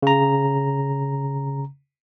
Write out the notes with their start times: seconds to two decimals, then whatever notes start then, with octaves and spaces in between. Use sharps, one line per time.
0.03 C#3 A#5